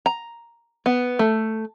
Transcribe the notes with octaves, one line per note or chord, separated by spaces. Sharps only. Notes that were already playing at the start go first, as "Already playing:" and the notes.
A#5
B3
A3